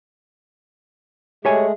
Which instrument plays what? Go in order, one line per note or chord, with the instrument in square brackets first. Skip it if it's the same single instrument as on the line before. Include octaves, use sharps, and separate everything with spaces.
[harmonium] G#3 A3 G#4 [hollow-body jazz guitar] G4 C#5 G#5